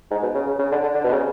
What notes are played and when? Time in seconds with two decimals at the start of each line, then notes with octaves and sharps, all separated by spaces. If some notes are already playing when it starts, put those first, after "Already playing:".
0.11 G#2
0.23 B2
0.35 C#3
0.47 C#3
0.59 C#3
0.72 D3
0.83 D3
0.95 D3
1.04 B2
1.13 C#3